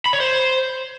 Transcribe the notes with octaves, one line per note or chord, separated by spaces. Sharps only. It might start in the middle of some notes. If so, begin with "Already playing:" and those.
B5
C#5
C5